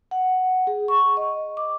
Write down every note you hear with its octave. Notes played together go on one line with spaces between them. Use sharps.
F#5
G#4
C#6
D#5
D6